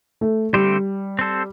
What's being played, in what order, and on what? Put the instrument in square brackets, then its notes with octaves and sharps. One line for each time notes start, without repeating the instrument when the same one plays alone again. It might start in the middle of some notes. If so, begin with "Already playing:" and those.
[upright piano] A3
[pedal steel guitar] D3 A3 C4 G4 C5 [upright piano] G3
[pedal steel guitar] C4 A4 C5